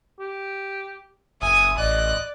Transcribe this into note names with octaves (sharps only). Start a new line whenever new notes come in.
G4
F#1 E5 G#5 D#6
A1 D5 D#5 F#6